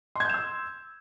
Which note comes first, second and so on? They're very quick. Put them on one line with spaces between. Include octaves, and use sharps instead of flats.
C6 G#6 G6 E7 E6